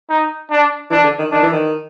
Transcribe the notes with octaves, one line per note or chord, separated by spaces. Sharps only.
D#4
D4
E3 D4
D3
D#3
D#3 D4
E3
D#3